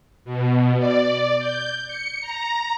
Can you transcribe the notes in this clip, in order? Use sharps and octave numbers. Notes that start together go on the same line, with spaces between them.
B2
D5
G6
C#7
A#5